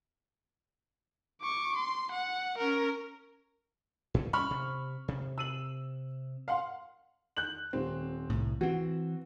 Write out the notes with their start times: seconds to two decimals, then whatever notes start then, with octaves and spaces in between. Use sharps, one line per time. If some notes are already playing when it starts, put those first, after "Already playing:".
1.41 C#6 D6
1.75 C6
2.12 F#5
2.58 C#4 A#4
4.14 G#2 B2 D3
4.33 G3 C4 C#4 B5 C#6 F6
4.51 C3
5.08 C3
5.38 E6 D#7 F#7
6.48 F5 F#5 C6
7.37 F#6 G6 F#7
7.73 D#1 C4
8.30 C2 A2
8.61 E3 C4 F#4